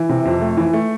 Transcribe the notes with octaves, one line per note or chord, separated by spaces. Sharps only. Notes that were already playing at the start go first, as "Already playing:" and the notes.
Already playing: E3
C3
F2
A3
E3
A3